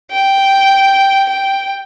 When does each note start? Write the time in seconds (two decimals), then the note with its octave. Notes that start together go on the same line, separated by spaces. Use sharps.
0.11 G5
1.29 G5